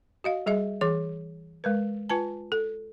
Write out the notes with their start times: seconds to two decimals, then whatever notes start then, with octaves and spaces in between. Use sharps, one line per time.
0.24 F#4 D#5 F5
0.46 G3 G#4 D#5 E5
0.81 E3 G#4 D6
1.64 G#3 A#4 B4
2.09 F4 B4 G#5 A5
2.52 A4